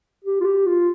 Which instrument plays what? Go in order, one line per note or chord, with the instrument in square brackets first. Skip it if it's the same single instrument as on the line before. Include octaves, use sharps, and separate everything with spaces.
[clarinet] G4
F4
G4
F4